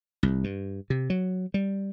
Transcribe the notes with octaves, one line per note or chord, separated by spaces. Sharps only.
C2
G2
C3
F#3
G3